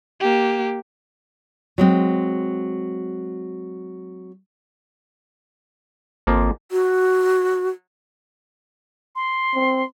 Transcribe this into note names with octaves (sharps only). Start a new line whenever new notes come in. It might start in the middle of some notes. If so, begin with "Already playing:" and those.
A#3 G4
F#3 G#3 C4
G#1 F2 F3 A#3
F#4
C6
C4